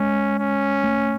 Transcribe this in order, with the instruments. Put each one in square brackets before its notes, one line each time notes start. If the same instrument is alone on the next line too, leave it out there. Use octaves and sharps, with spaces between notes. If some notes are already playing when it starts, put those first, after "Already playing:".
Already playing: [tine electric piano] G#3 [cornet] C#4
[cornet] C#4
[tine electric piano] A3